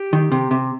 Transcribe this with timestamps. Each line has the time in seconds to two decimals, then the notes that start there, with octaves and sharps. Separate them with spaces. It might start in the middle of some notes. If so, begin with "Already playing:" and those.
Already playing: G4
0.13 D#3
0.32 C3
0.51 C3